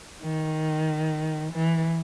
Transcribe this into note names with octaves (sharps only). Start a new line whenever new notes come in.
D#3
E3